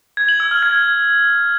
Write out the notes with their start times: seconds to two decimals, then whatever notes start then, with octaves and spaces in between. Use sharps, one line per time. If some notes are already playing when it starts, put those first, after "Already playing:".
0.17 G#6
0.29 F#7
0.40 E6
0.51 F6
0.63 G#6